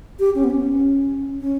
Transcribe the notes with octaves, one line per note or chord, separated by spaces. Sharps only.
G4
C#4
B3
C#4
C#4